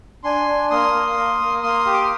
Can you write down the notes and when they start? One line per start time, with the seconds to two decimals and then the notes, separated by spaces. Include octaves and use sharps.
0.24 D4 G#5 C6
0.48 D4
0.71 A#3 C6 D#6
0.94 A#3
1.17 A#3
1.40 A#3
1.63 A#3 C6 D#6
1.86 G4
1.93 D6
2.01 D#6